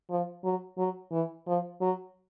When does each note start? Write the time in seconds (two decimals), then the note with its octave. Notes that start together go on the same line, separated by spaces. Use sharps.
0.10 F3
0.44 F#3
0.78 F#3
1.11 E3
1.47 F3
1.81 F#3